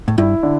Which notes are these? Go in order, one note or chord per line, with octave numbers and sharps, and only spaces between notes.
A2
G2 E4
D3